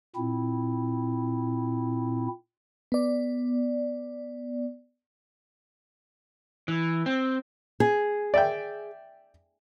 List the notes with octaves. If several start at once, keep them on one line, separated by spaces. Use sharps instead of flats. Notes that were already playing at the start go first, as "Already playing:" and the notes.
A#2 C4 E4
B3 D5
E3
C4
G#4
D5 E5 G5